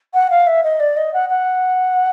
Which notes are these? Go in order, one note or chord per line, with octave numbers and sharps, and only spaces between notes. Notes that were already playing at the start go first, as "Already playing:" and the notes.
F#5
F5
E5
D#5
D5
D#5
F#5
F#5